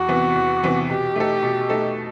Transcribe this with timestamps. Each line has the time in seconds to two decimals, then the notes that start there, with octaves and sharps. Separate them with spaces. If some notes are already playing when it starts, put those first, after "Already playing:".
Already playing: E2 F#4
0.08 C3 E3 B3
0.35 E2
0.63 C3 E3 B3
0.89 B2 G4
1.16 A3 D#4 A4
1.43 B2
1.70 A3 D#4 A4